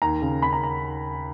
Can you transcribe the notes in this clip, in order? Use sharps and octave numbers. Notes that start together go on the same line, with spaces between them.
D#2 A#5
C#3
C#3 B5
A#5
A#5